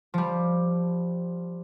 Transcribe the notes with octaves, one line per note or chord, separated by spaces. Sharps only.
F3 G3